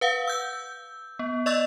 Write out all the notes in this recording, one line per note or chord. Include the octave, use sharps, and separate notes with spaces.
B4 F5 F#5
E6 G6
B3
D5 D#5 C#6 E6 A6